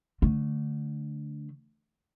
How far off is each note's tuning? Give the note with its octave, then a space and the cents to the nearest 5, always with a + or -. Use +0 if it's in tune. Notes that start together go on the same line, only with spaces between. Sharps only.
D3 +0 A3 +0